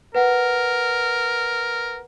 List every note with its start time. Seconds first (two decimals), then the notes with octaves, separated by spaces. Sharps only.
0.15 A#4 B4 F#5